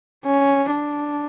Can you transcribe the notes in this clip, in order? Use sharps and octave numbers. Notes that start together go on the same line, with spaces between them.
C#4
D4